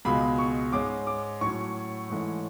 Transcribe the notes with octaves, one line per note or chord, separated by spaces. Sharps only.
C#2 B2 G#3 B5
C#6
G#2 G#3 C#4 D6
D6
A2 F#3 C#4 C#6
G#2 E3 A3 C#4